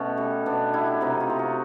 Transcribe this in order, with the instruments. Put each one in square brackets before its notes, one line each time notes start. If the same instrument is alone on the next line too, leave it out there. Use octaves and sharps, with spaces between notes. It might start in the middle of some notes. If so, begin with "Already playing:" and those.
Already playing: [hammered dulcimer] B2 A3 C#4
G3
B2 D4
G3 E4
C3 D#4
F4
C3
F#4